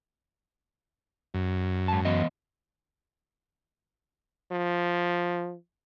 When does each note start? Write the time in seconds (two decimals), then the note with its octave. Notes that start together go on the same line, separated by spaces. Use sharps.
1.34 F#2
1.88 G#2 A5
2.05 E3 B3 D#5
4.51 F3